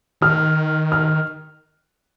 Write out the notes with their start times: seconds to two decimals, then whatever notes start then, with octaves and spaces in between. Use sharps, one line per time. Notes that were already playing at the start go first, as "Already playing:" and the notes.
0.21 D#3 F6
0.92 F6